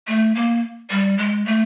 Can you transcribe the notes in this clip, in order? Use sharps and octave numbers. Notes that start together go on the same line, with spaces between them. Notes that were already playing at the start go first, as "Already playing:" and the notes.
A3
A#3
G3
G#3
A3